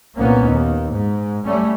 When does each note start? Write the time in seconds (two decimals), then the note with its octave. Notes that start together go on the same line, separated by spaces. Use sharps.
0.16 C2 A#2 A#3 B3 C#4
0.46 D#2
0.96 G#2
1.43 G3 A3 C#4